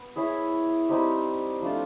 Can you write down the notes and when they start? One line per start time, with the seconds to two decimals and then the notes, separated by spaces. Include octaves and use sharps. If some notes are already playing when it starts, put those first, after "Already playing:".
Already playing: B3
0.16 E4 G#4 C#5 E5
0.89 G3 C4 D#4 G4
1.62 F3 A3 D4 F4